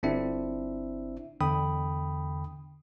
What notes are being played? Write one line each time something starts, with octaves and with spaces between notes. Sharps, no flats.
G1 C4 D4 E4 E5
E2 D3 G5 B5 D#6